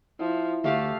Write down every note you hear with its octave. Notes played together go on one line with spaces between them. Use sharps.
F3 E4
D2 A3 G4 A4 F5